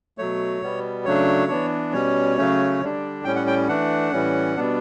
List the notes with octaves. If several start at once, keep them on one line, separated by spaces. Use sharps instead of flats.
B2 F#3 A3 C#5
B2 G3 B3
C#3 F#3 A3 D4 C#5
E3 B3 D4
B2 G3 C#4 C#5
C#3 F#3 A3 C#4
D3 G3 D4
A2 G3 C#4 G5
F#5
G5
E3 A3 D4 F#5
A2 E3 G3 C#4
B2 G3 B3 D4